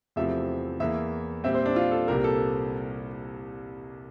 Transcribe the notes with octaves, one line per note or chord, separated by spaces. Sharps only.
E2 C3 F3 A3 C4 E5
E2 E3 A#3 E5
A#2 G3 C4 E5
C5
D4
F4
A4
C2 A#2 G3 C4 A#4
A4